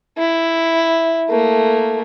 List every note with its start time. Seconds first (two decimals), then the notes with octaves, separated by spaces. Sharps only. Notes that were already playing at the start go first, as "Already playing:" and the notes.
0.18 E4
1.29 A3 A#3